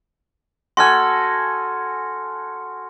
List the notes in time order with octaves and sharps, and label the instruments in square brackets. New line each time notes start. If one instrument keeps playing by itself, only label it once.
[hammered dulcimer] F#4 A4 G#5 [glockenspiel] C6 F6